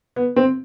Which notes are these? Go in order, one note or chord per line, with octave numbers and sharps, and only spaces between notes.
B3
C4